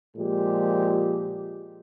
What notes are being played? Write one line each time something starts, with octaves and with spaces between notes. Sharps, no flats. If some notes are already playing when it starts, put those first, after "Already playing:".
A#2 F3 G#3 G4